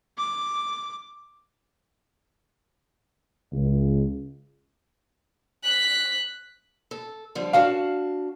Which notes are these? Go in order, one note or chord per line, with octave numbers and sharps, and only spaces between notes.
D6
C#2
F#6 B6
A4
D3 F3 G3
D4 F#4 F5 A5